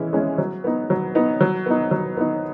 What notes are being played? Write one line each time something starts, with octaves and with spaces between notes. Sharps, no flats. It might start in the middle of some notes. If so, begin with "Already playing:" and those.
Already playing: E3 G#3 C#4 E4
G#3 C#4 E4
F#3
B3 D#4
F#3
B3 D#4
F#3
B3 D#4
F#3
B3 D#4